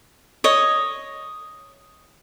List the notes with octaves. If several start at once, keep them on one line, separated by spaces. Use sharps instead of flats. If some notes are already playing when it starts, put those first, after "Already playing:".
C#5 D#5